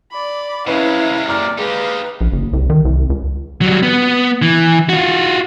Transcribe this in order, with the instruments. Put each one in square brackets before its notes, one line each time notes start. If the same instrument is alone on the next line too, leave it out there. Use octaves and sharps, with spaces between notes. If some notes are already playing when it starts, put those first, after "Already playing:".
[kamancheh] D5 B5
[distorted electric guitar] C3 G#3 [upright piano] C#4 B4 [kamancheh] E4 F5
[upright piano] F#1 A#5 F6 [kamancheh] D5
[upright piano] G#3 [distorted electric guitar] D#4 G4 [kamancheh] B4 F5
[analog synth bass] A#1
F#1
C2
D#3
C2
C#2
[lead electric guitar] F#3 G3
B3
E3
F4 F#4